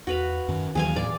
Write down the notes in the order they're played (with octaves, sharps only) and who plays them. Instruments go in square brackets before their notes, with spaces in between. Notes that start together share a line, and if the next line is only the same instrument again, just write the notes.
[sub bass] E2 [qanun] F#4 B4 F5
[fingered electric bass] F#2 [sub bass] D#3
[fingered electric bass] D#2 E3 F#3 [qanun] G#4 F5 G#5
[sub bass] A2 [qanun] D5